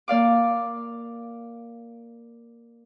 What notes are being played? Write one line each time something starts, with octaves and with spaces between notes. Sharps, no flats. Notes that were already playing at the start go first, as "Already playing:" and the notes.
A#3 D5 F5 D6